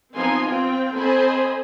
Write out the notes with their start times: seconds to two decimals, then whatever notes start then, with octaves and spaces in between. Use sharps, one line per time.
0.14 F3 B3 C4 D#4 G#5 C6
0.46 C4 F4 G5
0.96 C4 A4 C5 D#5 G#5 B5